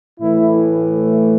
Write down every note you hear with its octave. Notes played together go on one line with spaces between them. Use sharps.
A2 E3 A3 E4